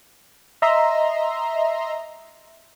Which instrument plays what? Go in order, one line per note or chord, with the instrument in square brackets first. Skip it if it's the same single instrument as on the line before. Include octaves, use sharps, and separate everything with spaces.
[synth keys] D#5 E5 A#5 C6